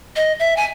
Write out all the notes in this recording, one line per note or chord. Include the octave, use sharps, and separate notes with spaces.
D#5
E5
G#5